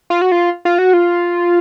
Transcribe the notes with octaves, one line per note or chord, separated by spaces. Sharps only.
F4
F#4
F4
F4
F#4
F4